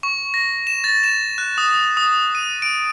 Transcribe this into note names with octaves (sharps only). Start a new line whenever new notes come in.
C#6
A#6
E7
A6
E7
F#6
D#6
D#6
D#7
D7